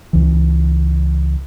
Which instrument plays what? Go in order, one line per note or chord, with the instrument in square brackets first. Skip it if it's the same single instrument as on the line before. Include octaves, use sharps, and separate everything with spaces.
[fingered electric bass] C#2 E3